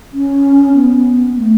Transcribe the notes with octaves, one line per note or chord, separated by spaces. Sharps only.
C#4
B3
A3